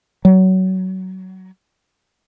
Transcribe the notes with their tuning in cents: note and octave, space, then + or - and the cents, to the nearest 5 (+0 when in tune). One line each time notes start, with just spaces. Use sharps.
F#3 +20